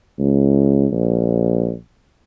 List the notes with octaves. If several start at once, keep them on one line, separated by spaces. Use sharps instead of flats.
C#2
A#1